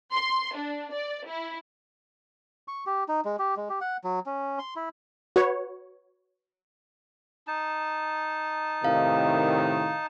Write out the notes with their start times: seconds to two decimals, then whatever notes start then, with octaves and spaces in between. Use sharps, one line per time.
0.12 C6
0.56 D4
0.93 D5
1.28 E4
2.68 C#6
2.86 G4
3.08 D#4
3.25 G#3
3.39 G4
3.57 G#3
3.69 G4
3.81 F#5
4.04 F#3
4.26 C#4
4.59 C6
4.76 E4
5.36 F#4 B4 C#5
7.47 D#4 A5
8.85 A2 C3 D#3 F5